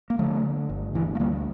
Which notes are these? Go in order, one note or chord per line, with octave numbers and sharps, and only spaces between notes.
A#3
D3 F3 A3
D3
G1
D2 E3
A3
D2 G3 A#3